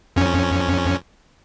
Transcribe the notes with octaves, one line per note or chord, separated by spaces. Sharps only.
F2 C#4